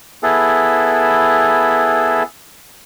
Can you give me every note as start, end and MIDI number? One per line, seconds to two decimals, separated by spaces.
0.23 2.23 59
0.23 2.23 64
0.23 2.23 68
0.23 2.23 69